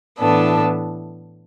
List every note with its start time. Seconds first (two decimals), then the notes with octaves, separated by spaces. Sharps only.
0.20 A2 E3 B3 D4 A4